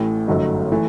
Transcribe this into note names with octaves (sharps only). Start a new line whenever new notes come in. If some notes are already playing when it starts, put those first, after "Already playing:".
Already playing: A1 A2 E3
G1 F#2 F#3 A3 D#4
E3 A3